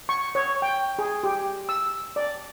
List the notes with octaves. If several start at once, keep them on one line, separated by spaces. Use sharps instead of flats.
C#6
C#5
G5
G#4
G4
E6
D5